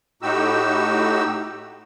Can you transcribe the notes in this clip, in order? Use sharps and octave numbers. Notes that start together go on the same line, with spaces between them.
A2 D#4 F#4 G4 E6